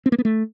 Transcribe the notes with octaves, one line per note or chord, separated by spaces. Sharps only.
C4
A#3
B3
A3